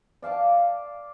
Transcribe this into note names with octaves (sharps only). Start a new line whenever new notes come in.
D5 F5 A5 D6